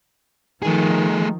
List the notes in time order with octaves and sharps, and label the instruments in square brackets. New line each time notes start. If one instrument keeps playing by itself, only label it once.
[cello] D#3 F3 [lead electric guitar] A3 G#4